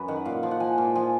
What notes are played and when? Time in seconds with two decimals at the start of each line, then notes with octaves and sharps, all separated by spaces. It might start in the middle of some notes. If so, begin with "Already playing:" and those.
Already playing: F#2 F#3 B4
0.08 D#3 F#5
0.25 A#2 F5
0.43 F3
0.51 F#5
0.60 F3 G#5
0.78 A#2
0.95 F3 G#5